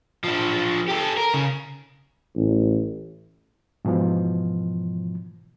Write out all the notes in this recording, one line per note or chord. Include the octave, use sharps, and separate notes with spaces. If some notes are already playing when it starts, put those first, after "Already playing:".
F3 D4
G4 A4
A#4
C#3
A1
G#2 B2 E3 F3